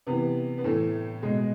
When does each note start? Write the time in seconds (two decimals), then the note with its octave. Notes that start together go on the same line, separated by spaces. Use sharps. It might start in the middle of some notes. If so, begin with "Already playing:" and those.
0.07 C3 E3 B3
0.58 B3
0.64 A2 E3 A3
1.22 B2 G#3